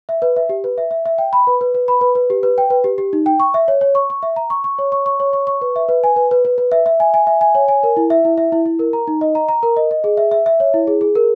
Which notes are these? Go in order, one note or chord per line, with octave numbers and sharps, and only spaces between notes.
E5
B4
E5
G4
B4
E5
E5
E5
G5
B5
B4
B4
B4
B5
B4
B4
G4
B4
G5
B4
G4
G4
D#4
G5
C#6
E5
C#5
C#5
C#6
C#6
E5
A#5
C#6
C#6
C#5
C#6
C#6
C#5
C#6
C#6
B4
E5
B4
G#5
B4
B4
B4
B4
E5
E5
G#5
G#5
E5
G#5
C#5
G#5
A#4
E4
E5
E4
E5
E4
E4
A#4
A#5
D#4
D#5
A#5
A#5
A#4
D#5
D#5
G#4
E5
E5
E5
C#5
E4
G#4
G#4
A#4